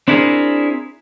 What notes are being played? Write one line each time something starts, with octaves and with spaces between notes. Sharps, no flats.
C4 D4 E4 F#4 G#4 A#4